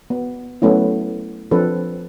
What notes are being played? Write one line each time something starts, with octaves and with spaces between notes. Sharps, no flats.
B3
F#3 A3 B3 C#4 E4
F3 C4 D4 A4 B4